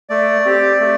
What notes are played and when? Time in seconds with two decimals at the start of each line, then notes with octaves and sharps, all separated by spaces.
0.09 A3 D5
0.45 C4 G4
0.80 A3